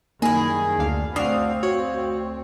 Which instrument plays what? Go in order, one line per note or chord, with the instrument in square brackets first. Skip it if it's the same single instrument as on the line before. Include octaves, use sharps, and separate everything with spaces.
[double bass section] F#2 D#3 G3 [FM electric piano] A#3 D#4 [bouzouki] E4 G#4
[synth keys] D2 D4 F5
[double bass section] D2 A3 C4 [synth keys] D4 F#4 [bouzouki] F5 [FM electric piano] D#6
[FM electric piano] F#4 [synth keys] C#5